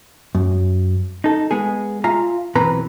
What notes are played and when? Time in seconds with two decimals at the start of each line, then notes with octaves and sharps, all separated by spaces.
0.35 F#2
1.24 D#4 A4
1.51 G#3 B3 G#4
2.04 F4 E5 F5 G#5 A#5
2.55 B1 E3 C4 B4 A#5 B5